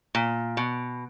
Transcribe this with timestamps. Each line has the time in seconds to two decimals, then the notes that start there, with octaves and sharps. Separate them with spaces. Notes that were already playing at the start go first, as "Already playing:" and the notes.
0.15 A#2
0.57 B2